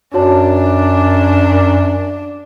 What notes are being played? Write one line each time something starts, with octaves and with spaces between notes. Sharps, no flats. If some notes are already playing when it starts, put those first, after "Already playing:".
F#2 D4 F#4 C#5 A5